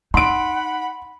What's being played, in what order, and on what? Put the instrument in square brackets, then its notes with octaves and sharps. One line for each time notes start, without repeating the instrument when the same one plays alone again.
[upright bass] D#4 [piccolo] F#5 [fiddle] B5 [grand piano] C6 D7